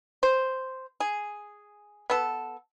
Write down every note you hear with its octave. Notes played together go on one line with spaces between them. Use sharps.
C5
G#4
B3 A4